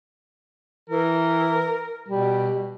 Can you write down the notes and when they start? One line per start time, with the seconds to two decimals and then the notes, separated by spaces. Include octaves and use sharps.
0.89 E3 A#4
2.08 B2 G3